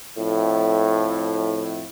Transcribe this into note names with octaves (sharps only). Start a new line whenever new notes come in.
F2 A2